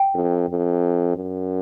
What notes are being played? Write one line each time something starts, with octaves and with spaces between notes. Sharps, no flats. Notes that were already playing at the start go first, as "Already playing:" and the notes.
Already playing: G5
F2
F2
F#2